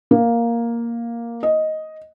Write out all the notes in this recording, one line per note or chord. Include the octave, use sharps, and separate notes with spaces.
A#3
D#5